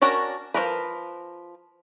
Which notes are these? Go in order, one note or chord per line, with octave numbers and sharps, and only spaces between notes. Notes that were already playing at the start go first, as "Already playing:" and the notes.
C#4 D4 F#4 A#4
F3 A3 A#4 B4